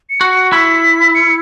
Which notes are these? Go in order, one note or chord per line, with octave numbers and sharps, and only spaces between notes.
C#7
F#4
C#7
E4 B6
C#7